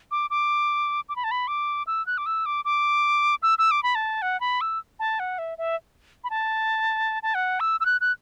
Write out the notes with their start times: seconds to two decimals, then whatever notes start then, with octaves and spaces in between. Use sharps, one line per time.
0.11 D6
0.30 D6
1.09 D6
1.16 B5
1.24 A5
1.31 B5
1.48 D6
1.87 E6
2.07 F#6
2.18 D6
2.26 E6
2.46 D6
2.65 D6
3.43 E6
3.59 E6
3.71 D6
3.83 B5
3.95 A5
4.22 F#5
4.41 B5
4.61 E6
4.99 A5
5.20 F#5
5.39 E5
5.58 E5
6.24 B5
6.30 A5
7.23 A5
7.35 F#5
7.60 E6
7.80 E6
7.86 F#6
8.01 F#6